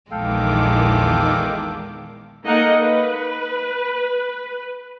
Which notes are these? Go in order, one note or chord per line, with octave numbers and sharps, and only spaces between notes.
A#1 E2 D#3 G#3 A4 F5 G5 D6
A#3 D#4 A4 A#4 D#5 F#5
B4